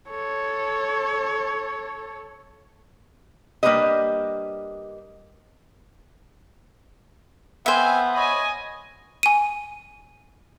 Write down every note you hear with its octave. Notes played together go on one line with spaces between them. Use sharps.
A4 C#5
G3 A#3 D4 G4 B4 D#5
B3 C4 C5 E5 F5 G#5
C#5 D#5 G#5 B5
G#5 D#7